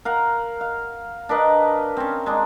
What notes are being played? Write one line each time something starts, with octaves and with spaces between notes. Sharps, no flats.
A#4 F5 F#5
F5
D4 A#4 B4 D#5
C4 C#4
G#3 D4 D#4